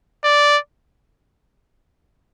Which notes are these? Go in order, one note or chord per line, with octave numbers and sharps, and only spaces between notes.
D5